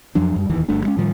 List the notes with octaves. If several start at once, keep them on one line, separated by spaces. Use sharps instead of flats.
F2 F3 F#3 D4
F#2 G3
D1 E2 D#3 E3
G1 G2 A3 D4
G3 G#3 C#4
A2 D#3 F3 G3